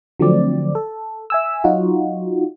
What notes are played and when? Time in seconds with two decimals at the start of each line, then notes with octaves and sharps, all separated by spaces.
0.20 D3 F3 F#3 A3 C4 D5
0.75 A4
1.30 E5 G#5 E6
1.64 F#3 D#4 F4 F#4